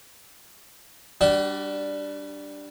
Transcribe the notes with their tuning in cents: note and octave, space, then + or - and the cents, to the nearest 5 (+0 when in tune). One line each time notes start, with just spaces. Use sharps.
G3 +0 D4 +0 F#4 +35